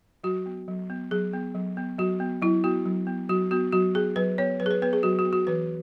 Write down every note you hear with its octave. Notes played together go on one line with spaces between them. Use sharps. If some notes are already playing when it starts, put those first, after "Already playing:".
F#3 F#4
B3
F#3
B3
F#3 G#4
B3
F#3
B3
F#3 F#4
B3
F#3 E4
B3 F#4
F#3
B3
F#3 F#4
B3 F#4
F#3 F#4
B3 G#4
F#3 B4
B3 C#5
F#3 B4
G#4
B4
B3 B4
G#4
F#3 F#4
F#4
B3
F#4
E3 B4